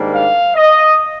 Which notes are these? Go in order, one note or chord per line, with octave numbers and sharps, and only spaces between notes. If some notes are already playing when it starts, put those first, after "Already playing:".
Already playing: G#2 D#3 G3 A#3 D4
F5
D#5